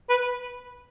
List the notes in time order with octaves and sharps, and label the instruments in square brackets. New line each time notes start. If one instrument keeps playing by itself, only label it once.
[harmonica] B4